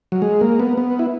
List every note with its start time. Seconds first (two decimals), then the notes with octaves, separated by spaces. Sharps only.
0.12 F#3
0.22 G#3
0.41 A#3
0.60 B3
0.77 B3
0.99 E4